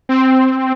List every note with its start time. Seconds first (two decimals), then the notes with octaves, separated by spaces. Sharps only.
0.09 C4